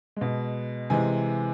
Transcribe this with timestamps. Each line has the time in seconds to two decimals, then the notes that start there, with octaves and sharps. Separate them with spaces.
0.16 B2 G#3
0.90 C3 E3 G#3 G#5